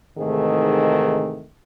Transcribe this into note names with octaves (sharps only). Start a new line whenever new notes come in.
G#2 C3 D#3 E3 A3 G#4